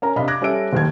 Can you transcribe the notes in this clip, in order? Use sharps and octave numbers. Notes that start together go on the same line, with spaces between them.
C#4 A#4 A#5
C3 D4 D#5 F5 B5
D6 F#6 G#6 A#6
G3 C#4 G4 A4 E5 D7
F#1 D#2 G#6